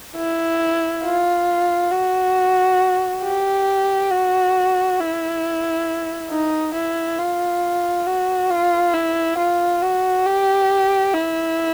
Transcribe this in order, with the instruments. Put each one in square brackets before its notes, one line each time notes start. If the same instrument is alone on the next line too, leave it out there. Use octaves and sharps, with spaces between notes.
[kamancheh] E4
F4
F#4
G4
F#4
E4
D#4
E4
F4
F#4
F4
E4
F4
F#4
G4
E4